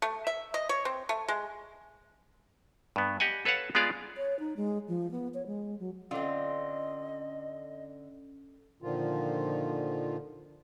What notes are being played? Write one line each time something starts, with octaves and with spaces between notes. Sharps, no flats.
A3
E5
D#5
C#5
C4
A3
G#3
G2 B3
G4 D#5 F#5 G#5
A4 B4 C#5 F5 F#5 A5
G#3 B3 F4 G#4 D5 F5
C#5
D#4
G#3
F3
B3
C#5
G#3
F#3
D3 C4 C#4 F4 A4 D#5
A#2 D3 D#3 F3 F4